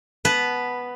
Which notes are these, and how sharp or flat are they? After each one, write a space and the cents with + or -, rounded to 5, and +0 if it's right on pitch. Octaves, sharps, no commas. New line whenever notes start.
B3 +0 B4 +0 A5 -20